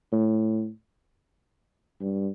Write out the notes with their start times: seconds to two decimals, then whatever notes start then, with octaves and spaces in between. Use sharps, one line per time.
0.13 A2
2.01 G2